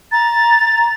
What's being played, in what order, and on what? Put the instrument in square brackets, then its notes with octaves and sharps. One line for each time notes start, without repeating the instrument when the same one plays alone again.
[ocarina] A#5 [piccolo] A6